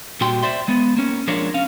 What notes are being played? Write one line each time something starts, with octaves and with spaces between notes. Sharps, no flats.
A#2 G3 F#4 G4 G5 C6
C5 D5 E5 C6
G#3 B3
A#3 C#4
F3 G#3 D4 A#4 C#5 D5
C#4 F5